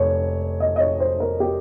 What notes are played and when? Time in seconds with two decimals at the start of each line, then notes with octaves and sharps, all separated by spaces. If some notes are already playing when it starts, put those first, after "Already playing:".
Already playing: F1 C#5
0.60 D#5
0.76 D#5
0.80 C#5
1.00 C5
1.20 A#4
1.40 G4